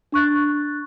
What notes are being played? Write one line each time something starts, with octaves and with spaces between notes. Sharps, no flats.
D4 C#6 F#6 A6